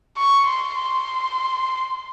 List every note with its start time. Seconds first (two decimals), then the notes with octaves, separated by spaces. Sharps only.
0.17 C#6
0.46 C6
0.75 C6